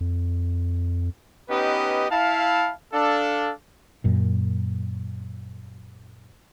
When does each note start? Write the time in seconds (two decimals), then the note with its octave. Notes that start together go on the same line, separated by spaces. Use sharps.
0.01 F2
1.48 B3 C#4 D#4 G4 B4 D#5
2.10 E4 F5 A5
2.93 D4 A4 F5
4.04 F#2 A#2